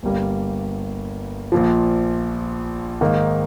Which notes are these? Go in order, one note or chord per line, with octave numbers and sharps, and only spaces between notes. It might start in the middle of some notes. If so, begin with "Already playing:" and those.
G1 G2 G3 A#3
A#1 A#2 F3
G#2 D#3 A#3 D#4